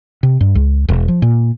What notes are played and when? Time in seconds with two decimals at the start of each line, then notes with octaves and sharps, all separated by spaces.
0.23 C3
0.41 G2
0.55 C#2
0.88 E1
1.08 F3
1.22 A#2